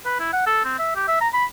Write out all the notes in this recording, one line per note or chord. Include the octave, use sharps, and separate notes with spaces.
B4
E4
F#5
A4
C4
E5
G4
E5
A#5
B5